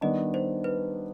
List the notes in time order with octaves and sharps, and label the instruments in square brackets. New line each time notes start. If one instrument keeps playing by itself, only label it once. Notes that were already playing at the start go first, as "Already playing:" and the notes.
[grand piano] D#3 G3 B3 D4 [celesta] D#5
[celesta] C5
B4